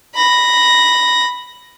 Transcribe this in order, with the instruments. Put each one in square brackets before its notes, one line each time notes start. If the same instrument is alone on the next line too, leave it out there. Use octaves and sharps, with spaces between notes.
[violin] B5 A#6